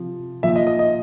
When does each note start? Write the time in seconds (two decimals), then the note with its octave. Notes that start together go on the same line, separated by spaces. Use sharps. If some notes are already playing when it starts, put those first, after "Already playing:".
Already playing: C3 F3
0.43 A#2 F3 E5
0.56 D#5
0.67 D#5
0.79 D#5